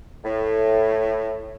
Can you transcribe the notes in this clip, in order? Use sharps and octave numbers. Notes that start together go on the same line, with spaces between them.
A2